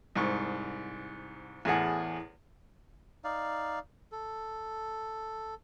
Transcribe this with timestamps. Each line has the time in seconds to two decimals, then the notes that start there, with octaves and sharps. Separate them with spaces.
0.16 C2 G#2 C#6
1.65 E2 A2 G#4 F#5
3.24 D#4 D5 F5
4.12 A4